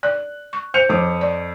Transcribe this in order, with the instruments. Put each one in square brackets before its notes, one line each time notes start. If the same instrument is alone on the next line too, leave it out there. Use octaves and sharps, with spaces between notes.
[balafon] D5 [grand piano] F#6
[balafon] C#6
[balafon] C5 [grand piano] G6 C#7 F7
[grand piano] F2 D6 [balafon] F3
[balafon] D5